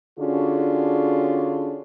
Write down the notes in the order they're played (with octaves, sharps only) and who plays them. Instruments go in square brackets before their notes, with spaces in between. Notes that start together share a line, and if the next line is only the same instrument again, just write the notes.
[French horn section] D3 C#4 D4 F4 F#4 G#4